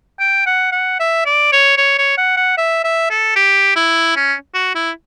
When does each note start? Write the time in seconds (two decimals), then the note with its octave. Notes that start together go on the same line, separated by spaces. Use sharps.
0.20 G5
0.46 F#5
0.72 F#5
1.00 E5
1.26 D5
1.52 C#5
1.78 C#5
1.98 C#5
2.18 F#5
2.37 F#5
2.58 E5
2.84 E5
3.10 A4
3.36 G4
3.76 E4
4.16 C#4
4.55 F#4
4.75 E4